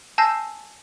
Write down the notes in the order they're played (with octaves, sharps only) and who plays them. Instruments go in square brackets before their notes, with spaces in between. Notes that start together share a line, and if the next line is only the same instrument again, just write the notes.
[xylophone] G#5 A5 E6 G6 A#6 C7